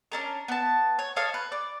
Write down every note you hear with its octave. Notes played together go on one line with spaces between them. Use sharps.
C#4 D4 A#4
B3 A5
C#5
A4 C#5 D#5 F5
B4
D5